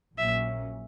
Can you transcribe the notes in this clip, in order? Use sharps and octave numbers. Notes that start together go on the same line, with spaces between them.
A#1 A#2 F#3 A#3 C#4 E5